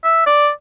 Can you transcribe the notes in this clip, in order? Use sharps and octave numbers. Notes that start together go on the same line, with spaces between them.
E5
D5